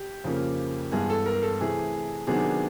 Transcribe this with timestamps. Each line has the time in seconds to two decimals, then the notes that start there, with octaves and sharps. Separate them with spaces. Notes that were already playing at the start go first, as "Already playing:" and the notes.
Already playing: G4
0.24 F2 C#3 F3 A#3 C#4
0.92 G2 E3 G#3 B3 G#4
1.10 A4
1.26 A#4
1.42 A4
1.60 C3 E3 A3 G#4
2.27 C3 D#3 F#3 B3 D4 G#4